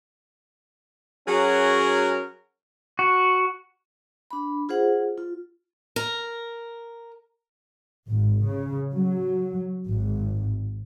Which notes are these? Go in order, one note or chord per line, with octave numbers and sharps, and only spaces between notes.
F#3 C#4 F#4 G#4 A#4
F#4
D4 B5
F4 G#4 C5 F#5
F4
A#4
G#1
C#3
F#3
G#1